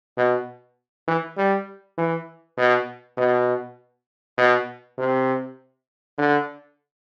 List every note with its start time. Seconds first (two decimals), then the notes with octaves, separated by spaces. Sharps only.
0.17 B2
1.08 E3
1.37 G3
1.98 E3
2.58 B2
3.18 B2
4.38 B2
4.98 C3
6.18 D3